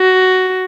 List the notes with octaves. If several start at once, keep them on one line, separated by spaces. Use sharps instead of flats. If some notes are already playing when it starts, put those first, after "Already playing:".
Already playing: F#4